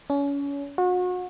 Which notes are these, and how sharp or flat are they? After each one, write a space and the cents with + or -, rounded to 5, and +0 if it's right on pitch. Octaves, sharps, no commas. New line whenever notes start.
C#4 +30
F#4 -35